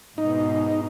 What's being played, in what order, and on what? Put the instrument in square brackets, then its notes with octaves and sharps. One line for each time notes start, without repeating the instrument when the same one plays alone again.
[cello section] G#2 B2 [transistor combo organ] D#4